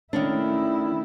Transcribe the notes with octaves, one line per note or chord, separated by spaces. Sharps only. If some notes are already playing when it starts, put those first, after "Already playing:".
D#3 A3 C#4 D4 E4